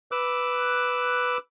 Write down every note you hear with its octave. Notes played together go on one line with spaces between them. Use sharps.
B4 D6 E6 F#6